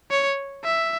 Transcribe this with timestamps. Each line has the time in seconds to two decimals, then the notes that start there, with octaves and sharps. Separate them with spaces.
0.11 C#5
0.64 E5